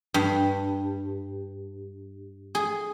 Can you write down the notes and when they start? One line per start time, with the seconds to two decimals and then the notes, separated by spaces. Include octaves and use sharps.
0.14 G2
2.55 G#4